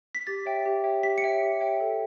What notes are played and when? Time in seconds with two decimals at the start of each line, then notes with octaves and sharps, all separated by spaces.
0.15 B6
0.27 G4 A6
0.45 C#5 E5 G5
0.66 G4
0.84 C#5 E5 G5
1.03 G4 B6
1.18 C#7
1.22 C#5 E5 G5 D7
1.41 G4
1.60 C#5 E5 G5
1.80 A4